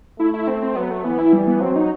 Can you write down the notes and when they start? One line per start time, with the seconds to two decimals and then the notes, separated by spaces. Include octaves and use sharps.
0.19 A3 E4
0.34 E4
0.47 C4
0.62 C4
0.76 F#3 B3
0.91 A3
1.04 E3 B3
1.19 E4
1.33 G3
1.47 B3
1.61 F#3 C4
1.76 D#4